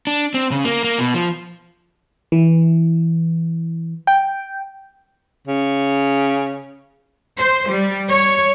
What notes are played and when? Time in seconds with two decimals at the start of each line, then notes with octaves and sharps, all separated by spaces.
0.07 D4
0.34 C4
0.52 C#3
0.64 A#3
0.84 A#3
0.99 B2
1.14 F3
2.32 E3
4.07 G5
5.47 C#3
7.40 C5
7.70 G3
8.09 C#5